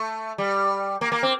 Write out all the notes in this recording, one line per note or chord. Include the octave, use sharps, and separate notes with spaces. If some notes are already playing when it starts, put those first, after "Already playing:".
Already playing: A3
G3
A#3
A#3
C4